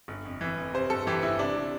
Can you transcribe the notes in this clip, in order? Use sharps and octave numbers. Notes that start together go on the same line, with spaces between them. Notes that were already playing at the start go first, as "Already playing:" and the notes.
G1
F2
E3
F2
C3 C5
G1 A4
E3 G4
G1 E4
C3 D4
C3